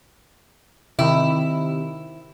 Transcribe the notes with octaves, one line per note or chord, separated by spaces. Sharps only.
C3 D#3 E4